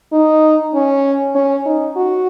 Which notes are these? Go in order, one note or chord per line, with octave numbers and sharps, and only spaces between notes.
D#4
C#4
C#4
D#4
F#4